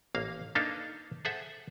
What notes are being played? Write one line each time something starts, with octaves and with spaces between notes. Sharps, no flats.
A1 A#3 F5
A#3 D4 D#4 A4 B4 F5
G#4 A4 C5 E5 F#5